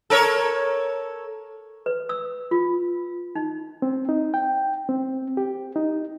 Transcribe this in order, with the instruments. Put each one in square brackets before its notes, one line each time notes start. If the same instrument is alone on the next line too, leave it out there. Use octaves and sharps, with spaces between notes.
[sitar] A4 A#4 C#5
[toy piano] B4
E6
F4
D#4
[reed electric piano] C4
D#4
G5
C4
G4
D#4